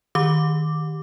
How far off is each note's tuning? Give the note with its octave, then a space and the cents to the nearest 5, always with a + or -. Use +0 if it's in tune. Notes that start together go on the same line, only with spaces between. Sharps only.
D#3 +0 G4 +0 D6 +0